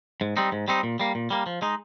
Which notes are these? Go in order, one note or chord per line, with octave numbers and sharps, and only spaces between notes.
G#2
G3 C4 D#4
G#2
G3 C4 D#4
A#2
G3 A#3
A#2
G3 A#3
F3
G#3 D#4